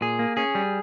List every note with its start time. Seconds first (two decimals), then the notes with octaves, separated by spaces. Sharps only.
0.01 A#2 G#4
0.19 A#3
0.37 C#4 G#4
0.55 G3